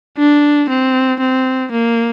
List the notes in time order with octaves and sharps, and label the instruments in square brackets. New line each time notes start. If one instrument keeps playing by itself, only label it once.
[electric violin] D4
C4
C4
A#3